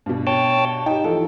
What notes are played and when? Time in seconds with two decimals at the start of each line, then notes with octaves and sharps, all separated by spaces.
0.06 G2 B2
0.27 C#5 G5 A5
0.86 D#4 G4 G5
1.05 E3 F3 A4